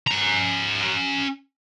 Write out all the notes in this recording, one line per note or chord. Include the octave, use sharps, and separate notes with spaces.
C#4 A#5